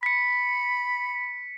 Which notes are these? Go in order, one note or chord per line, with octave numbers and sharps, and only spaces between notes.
B5 B6 C#7